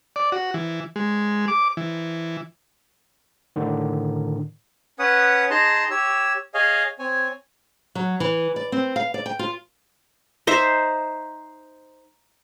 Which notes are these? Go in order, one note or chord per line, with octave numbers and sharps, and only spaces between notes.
D5
F#4
E3
G#3
D6
E3
A2 D3 D#3
C#4 B4 C#5 F#5 D#6
D#4 G#4 A5 A#5 C6
G4 C#5 E6
G#4 C#5 D#5 F5 G#5
C4 C#5 G#5
F#3
E3
D5
C4
F5
D5
G5
F4
D#4 C5 E5